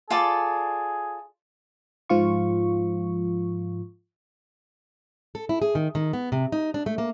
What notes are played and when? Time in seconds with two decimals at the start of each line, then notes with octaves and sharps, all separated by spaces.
0.10 F4 G#4 A4 D5
2.09 G#2 F3 F4 C#6
5.35 A4
5.49 E4
5.62 G#4
5.75 D#3
5.95 D#3
6.13 B3
6.32 C3
6.52 D#4
6.74 D4
6.86 A3
6.98 A#3